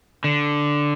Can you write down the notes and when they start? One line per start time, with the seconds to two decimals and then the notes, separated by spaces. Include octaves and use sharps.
0.24 D3